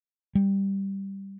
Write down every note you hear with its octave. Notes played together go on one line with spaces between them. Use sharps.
G3